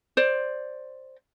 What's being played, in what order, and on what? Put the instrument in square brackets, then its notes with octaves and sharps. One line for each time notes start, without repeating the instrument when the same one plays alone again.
[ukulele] C5 D5